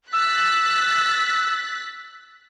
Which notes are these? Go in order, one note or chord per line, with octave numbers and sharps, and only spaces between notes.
E6 F#6 A6 B6